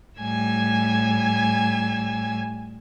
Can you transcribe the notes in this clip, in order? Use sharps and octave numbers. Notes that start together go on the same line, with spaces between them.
A2 G3 G#5 E6 G#6